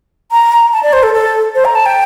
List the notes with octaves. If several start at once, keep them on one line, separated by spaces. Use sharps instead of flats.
A#5
A5
D5
C5
A4
A4
C5
A#5
A5
G5